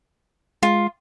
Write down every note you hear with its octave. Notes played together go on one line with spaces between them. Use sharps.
G#3 F4